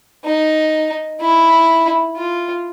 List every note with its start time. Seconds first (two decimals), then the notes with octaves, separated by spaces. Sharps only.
0.25 D#4
1.21 E4
2.16 F4